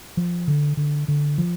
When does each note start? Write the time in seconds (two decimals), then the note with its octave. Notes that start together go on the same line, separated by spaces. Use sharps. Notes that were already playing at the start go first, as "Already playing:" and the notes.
0.17 F3
0.48 D3
0.77 D3
1.08 D3
1.38 F3